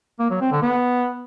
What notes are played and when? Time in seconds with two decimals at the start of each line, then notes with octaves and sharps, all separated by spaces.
0.20 A#3
0.30 F#3
0.41 C4
0.52 D3
0.62 B3